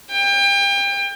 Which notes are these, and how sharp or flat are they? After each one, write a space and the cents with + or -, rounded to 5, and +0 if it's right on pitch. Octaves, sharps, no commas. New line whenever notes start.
G5 +30